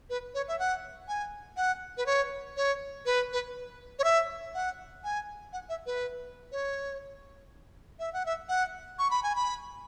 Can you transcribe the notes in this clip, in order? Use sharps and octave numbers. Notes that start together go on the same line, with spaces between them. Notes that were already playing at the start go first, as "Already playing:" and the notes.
B4
C#5
E5
F#5
G#5
F#5
B4
C#5
C#5
B4
B4
C#5
E5
F#5
G#5
F#5
E5
B4
C#5
E5
F#5
E5
F#5
C#6
B5
G#5
B5